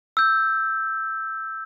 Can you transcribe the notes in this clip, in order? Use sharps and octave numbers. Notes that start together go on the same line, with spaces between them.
E6 G6